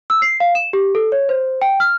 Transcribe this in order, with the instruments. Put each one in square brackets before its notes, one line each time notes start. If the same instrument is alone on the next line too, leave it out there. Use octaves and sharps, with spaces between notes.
[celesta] E6
C7
F5
E7
G4
A4
C#5
C5
G5
F6